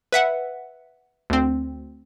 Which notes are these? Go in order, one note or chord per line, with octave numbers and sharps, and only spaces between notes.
B4 E5 F#5
D2 C4